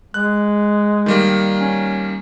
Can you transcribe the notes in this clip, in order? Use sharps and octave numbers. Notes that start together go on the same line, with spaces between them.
G#3 F#6
D#3 G3 A#3
C#4